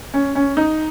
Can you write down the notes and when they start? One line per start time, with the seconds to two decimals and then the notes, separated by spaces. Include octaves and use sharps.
0.14 C#4
0.35 C#4
0.57 D#4